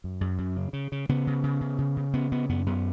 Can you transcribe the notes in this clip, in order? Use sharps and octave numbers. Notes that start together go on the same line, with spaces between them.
F#2
F#2
F#2
C#3
C#3
C#3
C#3 B3
C#3
C#3
C#3
C#3
C#3
C#3 B3
C#3 B3
F#2 B3
F#2 B3